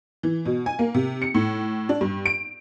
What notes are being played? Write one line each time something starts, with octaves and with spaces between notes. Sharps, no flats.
E3
B2
G#5
A#3
C3
C#7
A2
D4
G2
D7